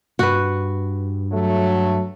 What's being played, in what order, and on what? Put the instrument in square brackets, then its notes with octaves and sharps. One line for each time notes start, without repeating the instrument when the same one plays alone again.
[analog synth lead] G2 [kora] F#4 B4
[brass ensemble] F#3 A3